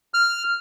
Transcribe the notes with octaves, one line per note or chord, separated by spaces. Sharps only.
F6